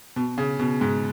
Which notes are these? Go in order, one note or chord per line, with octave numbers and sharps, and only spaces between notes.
B2
C#3
B2
G#2